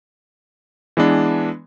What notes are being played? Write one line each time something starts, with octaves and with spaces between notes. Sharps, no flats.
E3 G#3 B3 D4